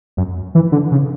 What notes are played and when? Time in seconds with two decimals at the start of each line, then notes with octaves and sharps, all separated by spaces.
0.17 F#2
0.55 E3
0.72 D3
0.92 C#3